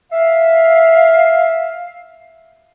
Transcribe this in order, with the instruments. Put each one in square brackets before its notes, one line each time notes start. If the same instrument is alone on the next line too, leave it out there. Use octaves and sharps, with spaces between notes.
[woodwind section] E5 F5